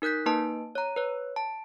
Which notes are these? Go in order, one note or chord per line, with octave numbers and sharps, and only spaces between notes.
D#4 A#4 F#6 G6 B6
A#3 D#4 B4 A5
C#5 A#5
B4 C#5
A5